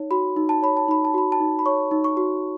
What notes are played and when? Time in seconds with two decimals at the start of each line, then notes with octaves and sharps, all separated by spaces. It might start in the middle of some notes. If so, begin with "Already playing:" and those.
Already playing: D#4 C#5
0.11 F#4 B5
0.37 D#4
0.49 A5
0.62 C#5 B5
0.77 A5
0.88 D#4 B5
1.05 A5
1.14 F#4 B5
1.32 A5
1.40 D#4
1.59 B5
1.66 C#5 C#6
1.91 D#4
2.04 C#6
2.17 F#4